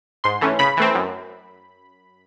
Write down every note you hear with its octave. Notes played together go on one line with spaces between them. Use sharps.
G#2 C6
E3 A3 C#4
C#3 B5
E3 A3 C4
F#2